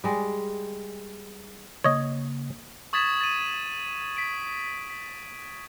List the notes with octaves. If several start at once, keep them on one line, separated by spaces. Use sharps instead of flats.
G3 G#3
C#3 A#3 C#5 D#5
C#6 D#6 G#6 A6 B6 E7
A6 D#7
B6 D7
B6